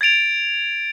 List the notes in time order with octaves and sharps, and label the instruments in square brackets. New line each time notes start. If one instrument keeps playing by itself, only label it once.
[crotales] G#6 A6 D7 F7